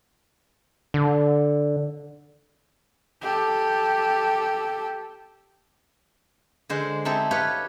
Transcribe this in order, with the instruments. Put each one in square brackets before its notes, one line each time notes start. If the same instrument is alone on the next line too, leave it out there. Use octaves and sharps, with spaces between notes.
[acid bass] D3
[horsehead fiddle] G4 A4
[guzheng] D3 G#3 C5
C4 D#4 E4 G4 A4
G4 B4 C#5 F5